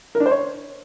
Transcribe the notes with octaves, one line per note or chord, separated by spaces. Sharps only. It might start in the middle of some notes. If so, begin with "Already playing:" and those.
A#4
D4
C5
C#5